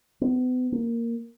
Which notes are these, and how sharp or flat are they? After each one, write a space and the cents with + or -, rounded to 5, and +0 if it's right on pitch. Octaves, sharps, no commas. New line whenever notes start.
B3 +35
A#3 -5